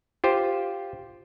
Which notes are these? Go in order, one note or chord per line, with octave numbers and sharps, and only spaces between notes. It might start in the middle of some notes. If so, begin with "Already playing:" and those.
F4 G4 C5